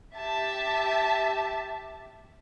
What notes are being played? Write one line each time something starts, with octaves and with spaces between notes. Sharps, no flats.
G4 E5 A5